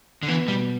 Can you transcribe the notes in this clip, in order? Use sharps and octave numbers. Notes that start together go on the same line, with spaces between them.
D3
E3 B3
B2 G3